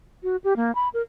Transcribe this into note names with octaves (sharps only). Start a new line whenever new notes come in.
F#4
G4
A#3
B5
A#4